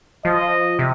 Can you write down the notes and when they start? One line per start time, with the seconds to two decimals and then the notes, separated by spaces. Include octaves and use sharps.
0.25 F3 D#5
0.79 C3